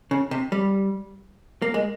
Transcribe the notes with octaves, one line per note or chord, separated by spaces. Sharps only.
C#3
C3
G3
A#3
G#3